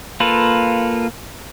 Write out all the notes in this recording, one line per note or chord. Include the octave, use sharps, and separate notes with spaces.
A#3 F4 A4 B4